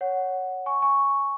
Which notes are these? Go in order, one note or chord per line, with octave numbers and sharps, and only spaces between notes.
C#5 F#5
G#5 C#6
G#5 C#6